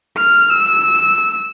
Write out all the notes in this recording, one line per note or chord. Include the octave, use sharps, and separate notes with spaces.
F6
E6